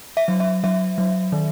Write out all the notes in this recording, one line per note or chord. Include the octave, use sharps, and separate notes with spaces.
E5
F#3
E5
F#3 E5
F#3
D#3